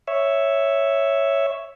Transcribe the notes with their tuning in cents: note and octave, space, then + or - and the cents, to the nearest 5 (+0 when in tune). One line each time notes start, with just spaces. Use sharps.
C#5 +0 E5 +0